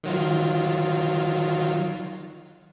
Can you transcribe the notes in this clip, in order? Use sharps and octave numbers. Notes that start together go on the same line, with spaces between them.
D#3 F#3 F4